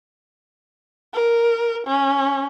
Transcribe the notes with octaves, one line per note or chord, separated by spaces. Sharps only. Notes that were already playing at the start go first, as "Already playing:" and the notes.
A#4
C#4